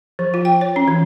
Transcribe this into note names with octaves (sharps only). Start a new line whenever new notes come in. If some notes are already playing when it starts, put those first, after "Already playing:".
F3
F4
G5
C#5
C#4
E3